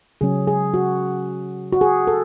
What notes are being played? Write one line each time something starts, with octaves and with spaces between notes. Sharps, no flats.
C#3 F#3 C#4 G#4
G#4
F#4
F#4
G#4
A4